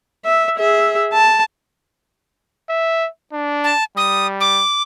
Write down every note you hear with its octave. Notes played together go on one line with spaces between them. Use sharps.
E5
G#4 E5
A5
E5
D4
A5
G3 D#6
D6